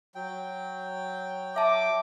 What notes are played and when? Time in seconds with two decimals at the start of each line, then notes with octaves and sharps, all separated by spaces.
0.15 F#3 G5
1.56 E5 A5 D6